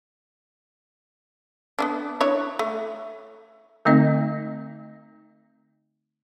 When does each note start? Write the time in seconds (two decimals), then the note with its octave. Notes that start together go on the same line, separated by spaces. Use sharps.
1.79 B3 C#4 D4
2.21 D4 E4 C#5
2.59 A3
3.85 D3 A3 C4 D#4 D#5